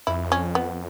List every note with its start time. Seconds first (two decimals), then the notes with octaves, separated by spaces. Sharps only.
0.07 F2 E4
0.32 C#4
0.55 B3